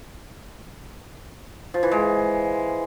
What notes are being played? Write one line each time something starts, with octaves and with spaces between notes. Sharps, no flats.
F3
E3
G#3